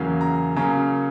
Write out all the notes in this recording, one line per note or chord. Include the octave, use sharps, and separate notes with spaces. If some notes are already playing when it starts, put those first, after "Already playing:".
Already playing: E2 C#3 F#3 A#3 C#4
A#5
C#3 F#3 A#3 C#4 A#5